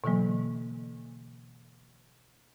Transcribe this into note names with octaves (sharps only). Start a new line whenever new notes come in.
B2 D3 E3 F#3 A#3